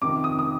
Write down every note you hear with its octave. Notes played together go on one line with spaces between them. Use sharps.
F2 C3 D#3 D6
D#6
D#6